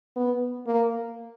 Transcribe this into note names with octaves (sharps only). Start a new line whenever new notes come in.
B3
A#3